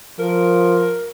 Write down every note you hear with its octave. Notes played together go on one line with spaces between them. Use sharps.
F3 A#4